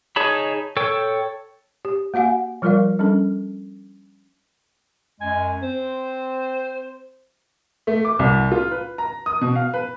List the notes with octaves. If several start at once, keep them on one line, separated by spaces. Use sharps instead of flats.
D#4 G#4 C#5 A5 B5
A4 C#5 G5
G4
A#3 F#4 F5 F#5 G#5
F3 G3 F4 A#4 D5 F5
G3 C#4 D4 A4
F#2 G#3 G#5
C4 C5
A3
D6
C2
F4
B4
A#5
D#6
B2
F5
B4